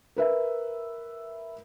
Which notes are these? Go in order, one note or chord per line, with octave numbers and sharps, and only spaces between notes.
A#4 B4 E5